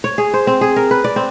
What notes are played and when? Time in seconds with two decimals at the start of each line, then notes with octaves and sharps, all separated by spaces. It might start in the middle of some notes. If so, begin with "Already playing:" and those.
0.04 C#5
0.18 G#4
0.34 C5
0.47 C4
0.61 G#4
0.76 A#4
0.91 B4
1.04 D5
1.16 C4